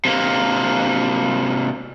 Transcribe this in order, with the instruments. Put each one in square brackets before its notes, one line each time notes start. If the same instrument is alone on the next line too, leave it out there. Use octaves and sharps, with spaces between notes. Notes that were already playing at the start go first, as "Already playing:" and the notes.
[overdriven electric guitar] C3 A#3